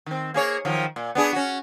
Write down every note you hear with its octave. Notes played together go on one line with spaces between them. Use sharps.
D#3 C4
A#3 G#4 C#5
D#3 F3 F#3
A#2
B3 D4 G#4
C#4 F#4